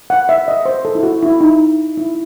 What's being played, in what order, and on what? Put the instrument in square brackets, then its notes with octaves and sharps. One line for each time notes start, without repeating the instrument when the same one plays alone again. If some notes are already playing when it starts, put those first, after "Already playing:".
[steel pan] F#5
E5
D#5
C5
A4
E4
F#4
E4
D#4
E4